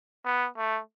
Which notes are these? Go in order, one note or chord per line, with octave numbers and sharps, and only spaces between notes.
B3
A3